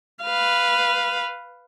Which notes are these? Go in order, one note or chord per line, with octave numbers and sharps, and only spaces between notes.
B4 F5